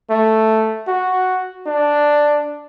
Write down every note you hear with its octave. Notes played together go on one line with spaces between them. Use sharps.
A3
F#4
D4